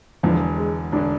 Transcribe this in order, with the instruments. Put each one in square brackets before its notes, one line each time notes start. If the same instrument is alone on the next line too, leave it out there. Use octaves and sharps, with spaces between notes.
[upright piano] E1 E2 D3 [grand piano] F3
[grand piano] G#3
[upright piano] E1 D3 [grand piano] D4